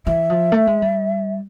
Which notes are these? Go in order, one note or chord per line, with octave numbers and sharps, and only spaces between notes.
E3 E5
F3
A3
G#3
G3